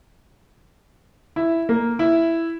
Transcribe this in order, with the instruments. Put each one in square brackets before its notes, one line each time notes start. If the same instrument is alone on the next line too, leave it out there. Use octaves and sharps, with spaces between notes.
[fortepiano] E4
A#3
E4